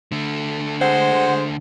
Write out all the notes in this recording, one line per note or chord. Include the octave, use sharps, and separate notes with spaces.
D3 A3
G#3 C5 F#5